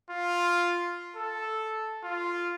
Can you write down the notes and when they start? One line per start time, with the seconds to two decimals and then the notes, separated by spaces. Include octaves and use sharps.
0.11 F4
1.16 A4
2.04 F4